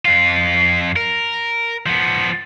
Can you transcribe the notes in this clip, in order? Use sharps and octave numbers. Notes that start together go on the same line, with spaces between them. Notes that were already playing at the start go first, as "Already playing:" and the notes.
F2 F4
A#4
F3 B3